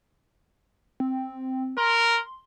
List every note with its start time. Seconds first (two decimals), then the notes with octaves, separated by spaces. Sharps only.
1.00 C4
1.77 A#4 C6